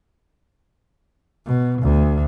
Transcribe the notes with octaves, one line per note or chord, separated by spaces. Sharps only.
B2
D2